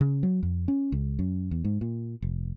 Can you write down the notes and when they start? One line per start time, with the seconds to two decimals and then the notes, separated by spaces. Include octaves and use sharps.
0.01 C#3
0.23 F#3
0.43 F2
0.68 C#4
0.92 C#2
1.19 F#2
1.51 E2
1.64 G#2
1.81 A#2
2.22 F1